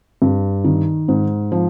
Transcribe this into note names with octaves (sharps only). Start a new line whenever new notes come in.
G2
D#3
G#2
F3